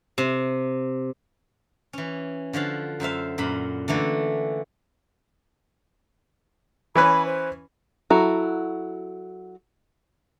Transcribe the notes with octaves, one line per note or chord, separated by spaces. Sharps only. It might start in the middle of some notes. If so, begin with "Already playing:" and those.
C3
E3 C#4
D3 F3 F#4 F5
F#2 C5 E5 F5
F#2 A#2 B5
D3 E3 A3 A#3
E3 C#4 B4 B5
C5
F#3 E4 F#4 A4 A#5